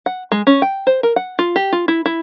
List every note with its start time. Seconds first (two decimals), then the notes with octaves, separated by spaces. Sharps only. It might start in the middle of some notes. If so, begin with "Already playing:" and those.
0.06 F#5
0.32 G#3
0.47 C#4
0.62 G5
0.87 C5
1.03 A#4
1.16 F#5
1.39 F4
1.56 G4
1.73 F4
1.88 E4
2.06 E4